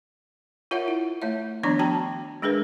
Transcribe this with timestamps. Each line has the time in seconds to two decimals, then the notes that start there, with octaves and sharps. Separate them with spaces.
0.71 F4 A#4 C#5 E5 F#5
0.88 E4
1.22 A3 C#5 E5
1.63 D#3 F3 B3 D4 C#5 A#5
1.79 B3 F#4 G5 A5 A#5
2.42 G#3 D4 G#4 A#4 B4